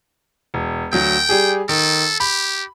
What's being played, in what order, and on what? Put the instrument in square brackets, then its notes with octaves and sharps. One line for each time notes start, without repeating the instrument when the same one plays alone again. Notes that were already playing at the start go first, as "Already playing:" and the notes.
[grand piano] E1
[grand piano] D2 F#3 [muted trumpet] G5
[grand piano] G3 G4 G#4
[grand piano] D#3 [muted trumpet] A4
[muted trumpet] G4 [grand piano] B5